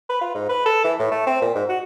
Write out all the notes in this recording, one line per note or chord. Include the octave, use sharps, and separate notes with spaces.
B4
F4
G#2
B4
A4
E3
A2
A3
C4
A#2
G#2
F#4